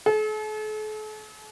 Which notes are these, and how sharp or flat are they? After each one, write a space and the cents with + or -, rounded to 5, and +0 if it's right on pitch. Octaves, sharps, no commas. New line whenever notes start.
A4 -45